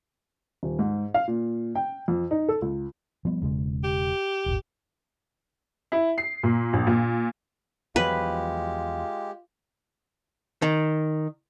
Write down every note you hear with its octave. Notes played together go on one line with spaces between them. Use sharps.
D#1
G#2
F5
A#2
G5
F2
D#4
A4
C#2
F3 G3 B3
E1 C#3 G#3
G4
D#1 G#1
E4
C7
A#2
A#1
A#2
E2 F3 F#3 G#3 F4 G4 B4
D#3